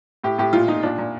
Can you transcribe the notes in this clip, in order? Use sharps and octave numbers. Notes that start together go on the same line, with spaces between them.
A2 G4
A2 G4
A#2 F4
A#2 D#4
A#2 D4
A#2